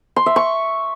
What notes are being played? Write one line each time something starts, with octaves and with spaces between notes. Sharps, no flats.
C6
E5
C#6